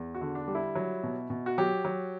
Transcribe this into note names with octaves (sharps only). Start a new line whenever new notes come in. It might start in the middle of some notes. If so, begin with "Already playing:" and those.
Already playing: E2
F#4
D3
D4
G3
E4
F#3
B2
B2
F#4
F#3 G4
F#3